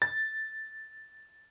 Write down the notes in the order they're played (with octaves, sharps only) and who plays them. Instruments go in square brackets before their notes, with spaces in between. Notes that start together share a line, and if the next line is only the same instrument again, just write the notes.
[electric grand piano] A6